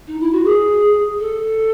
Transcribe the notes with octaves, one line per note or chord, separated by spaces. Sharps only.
D#4
E4
F#4
G#4
A4